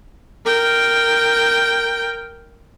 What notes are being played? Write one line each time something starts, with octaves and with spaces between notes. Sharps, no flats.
A#4 G5